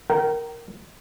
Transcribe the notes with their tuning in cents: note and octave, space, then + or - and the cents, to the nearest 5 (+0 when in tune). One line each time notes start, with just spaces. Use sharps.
A#4 +0 G5 -35